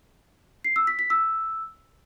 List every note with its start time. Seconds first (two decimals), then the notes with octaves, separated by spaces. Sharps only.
0.64 C7
0.76 E6
0.87 B6
0.99 B6
1.10 E6